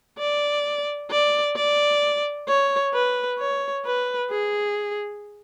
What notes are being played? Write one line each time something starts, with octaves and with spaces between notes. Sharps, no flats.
D5
D5
D5
C#5
B4
C#5
B4
G#4